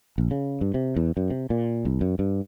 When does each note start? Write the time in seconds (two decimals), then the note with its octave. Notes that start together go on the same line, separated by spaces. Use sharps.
0.18 A#1
0.31 C#3
0.61 G2
0.74 C3
0.96 E2
1.17 F#2
1.30 C3
1.50 A#2
1.85 C2
2.01 F#2
2.19 G2